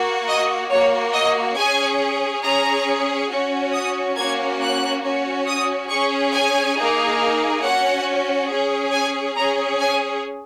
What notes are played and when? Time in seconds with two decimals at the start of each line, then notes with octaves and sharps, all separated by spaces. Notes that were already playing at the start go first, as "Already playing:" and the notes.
Already playing: A#3 F#4
0.27 D#5
0.70 A#3 F#4 C#5
1.14 D#5
1.56 C#4 G#4 G#5
2.43 C#4 G#4 A#5
3.29 C#4 F#4
3.73 D#6
4.16 A#3 C#4 F#4 G#6
4.60 F#6
5.02 C#4 F#4
5.46 D#6
5.89 C#4 G#4 C#6
6.33 G#5
6.75 A#3 D#4 G#4
7.62 C#4 F#4 F#5
8.49 C#4 G#4
8.92 G#5
9.35 C#4 G#4 A#5
9.79 G#5